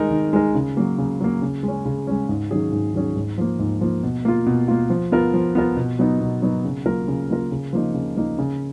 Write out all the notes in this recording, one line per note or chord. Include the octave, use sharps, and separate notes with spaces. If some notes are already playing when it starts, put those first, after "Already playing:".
Already playing: D#3 G#3 D#4 A#4
D#3
G#3 D#4 A#4
C#3
F#3 A#3
C#3
F#3 A#3
C#3
G#3
C#4
C#3
G#3 C#4
G#2
D#3 F#3 C#4 G#4
G#2
D#3 F#3 C#4 G#4
G#2
F3 A#3
G#2
F3 A#3
B2
A#3 F4
B2
A#3 F4
F3
B3 F4 A#4
F3
B3 F4 A#4
B2
F#3 B3 D#4
B2
F#3 B3 D#4
C#3
F#3 A#3 F4 A#4
C#3
F#3 A#3 F4 A#4
C#3
F3 A#3 D#4
C#3
F3 A#3 D#4
C#3